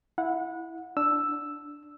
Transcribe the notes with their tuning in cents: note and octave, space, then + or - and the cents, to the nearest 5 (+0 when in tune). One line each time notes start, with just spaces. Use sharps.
E4 +0 F#5 -25
D4 +0 E6 +0